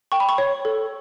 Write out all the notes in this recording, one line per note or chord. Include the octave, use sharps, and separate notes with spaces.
G5 C#6
B5
C#6
C#5
A4